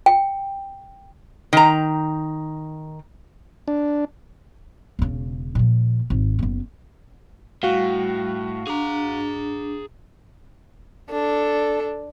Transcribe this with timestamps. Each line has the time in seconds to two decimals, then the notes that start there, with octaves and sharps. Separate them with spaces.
0.06 G5
1.53 D#3 A#5
3.68 D4
4.99 E1 C#3
5.55 A#2 F3
6.10 G#1
6.39 F#1 B3
7.63 A2 G3 F#4 F5
8.67 D4 G#4 A#5
11.11 D4 A4